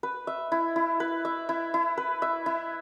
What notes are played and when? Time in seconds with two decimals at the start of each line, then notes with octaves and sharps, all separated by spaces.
0.03 B4
0.27 E5
0.52 E4
0.76 E4
1.00 B4
1.25 E5
1.49 E4
1.74 E4
1.98 B4
2.22 E5
2.46 E4